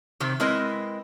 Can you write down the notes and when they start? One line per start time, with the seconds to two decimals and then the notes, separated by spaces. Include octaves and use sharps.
0.20 C3 D#3 C4
0.40 G#3 C4 E4 A#4 B4 D#5